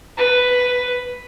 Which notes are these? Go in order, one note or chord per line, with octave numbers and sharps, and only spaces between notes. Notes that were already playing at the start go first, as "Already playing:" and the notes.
B4